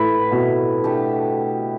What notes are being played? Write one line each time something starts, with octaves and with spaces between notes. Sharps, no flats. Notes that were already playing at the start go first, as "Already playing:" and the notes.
Already playing: A2 A3 E4 B4
B2
A3 D4 G4